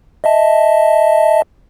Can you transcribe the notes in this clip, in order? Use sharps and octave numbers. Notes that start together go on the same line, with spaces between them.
D#5 E5 A5